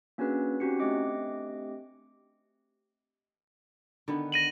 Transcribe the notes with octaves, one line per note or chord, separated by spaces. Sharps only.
A#3 C#4 D4 F#4 G#4 B4
C4 C#4 D#4 F#4 G4 C#7
A3 C4 D4 G4 D#5 D6
D3 D#3 B3
A#6 D#7 F#7